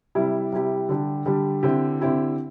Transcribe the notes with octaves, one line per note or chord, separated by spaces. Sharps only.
C3 G3 E4 G4
C3 G3 E4 G4
D3 G3 D4 G4
D3 G3 D4 G4
D3 C4 E4 G4
D3 C4 E4 G4